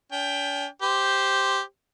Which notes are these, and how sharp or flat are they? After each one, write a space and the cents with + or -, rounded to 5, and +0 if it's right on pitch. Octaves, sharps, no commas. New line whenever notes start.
C#4 +45 G5 +10
G4 +0 C5 +0